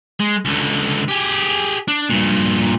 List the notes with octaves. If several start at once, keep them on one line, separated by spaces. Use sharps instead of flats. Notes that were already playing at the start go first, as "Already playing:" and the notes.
G#3
C#2 D3
G4 G#4
D4
G2 A#2